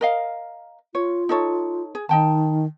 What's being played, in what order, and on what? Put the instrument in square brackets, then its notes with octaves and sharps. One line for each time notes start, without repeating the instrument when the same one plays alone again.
[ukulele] A#4 D#5 F5
[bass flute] F4 [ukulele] C#5
[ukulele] D#4 A4 C#5
G#4
[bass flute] D#3 [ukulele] D#4 G5 A5